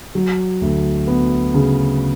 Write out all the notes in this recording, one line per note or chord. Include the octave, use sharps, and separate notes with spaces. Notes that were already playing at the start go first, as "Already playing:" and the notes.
F#3
D2
B3
C#3